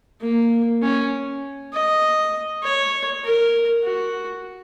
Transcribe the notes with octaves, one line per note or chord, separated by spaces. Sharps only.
A#3
C#4
D#5
C#5
A#4
F#4